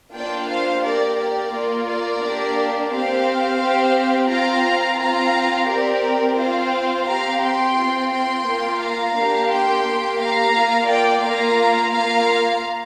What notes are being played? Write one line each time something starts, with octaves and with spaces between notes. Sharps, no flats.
A#3 D4 F4 D5 G5
C5 F5
A#3 G4 A#4 D5
A#4 D5
A#3 F4
A#4 D5
A#3 D4 G4
C4 G4 C5 F5
C4 G4
C4 F4 F5 A#5
C4 F4 F5 A#5
C4 G4 A#4 D5
C4 F4 C5 F5
C4 G4 F5 A#5
G5 C6
C4 F4
G5 C6
A#3 F4
F5 A#5
A#3 D4 G4
G5 C6
A#3 G4
F5 A#5
A#3 F4
D5 G5
A#3 F4 F5 A#5
A#3 F4 F5 A#5